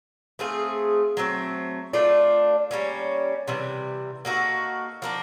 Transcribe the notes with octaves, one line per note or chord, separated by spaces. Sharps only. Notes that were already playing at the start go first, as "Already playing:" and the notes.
A3 C4 F4 G#4
F#3 A3 C4
A3 D4 F4
G3 A#3 C#4
C3 E3 G3
A#3 D#4 F#4 A4
F3 A#3 D4